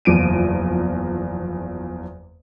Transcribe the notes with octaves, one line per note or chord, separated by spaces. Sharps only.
F#1 E2 F3 D7 D#7